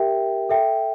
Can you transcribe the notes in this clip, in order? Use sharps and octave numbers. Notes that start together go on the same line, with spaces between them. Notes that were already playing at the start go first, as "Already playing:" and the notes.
Already playing: G4 A#4 E5 G5
A4 E5 G5